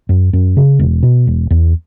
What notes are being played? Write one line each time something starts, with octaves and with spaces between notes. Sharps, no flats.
F#2
F#2
C#3
E1
B2
E1
E2